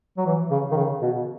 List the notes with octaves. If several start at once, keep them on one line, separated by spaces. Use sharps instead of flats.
F#3
E3
C#3
D#3
C#3
B2